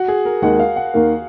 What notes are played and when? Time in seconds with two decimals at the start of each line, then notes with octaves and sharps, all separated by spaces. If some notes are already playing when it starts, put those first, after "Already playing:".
Already playing: F#4
0.08 G#4
0.25 A#4
0.42 D#2 D#3 G#3 D#4 F#5
0.59 F5
0.76 F#5
0.94 D#2 D#3 A#3